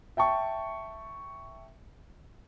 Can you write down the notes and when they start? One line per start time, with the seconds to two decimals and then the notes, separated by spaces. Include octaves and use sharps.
0.17 E5 G5 A5 C#6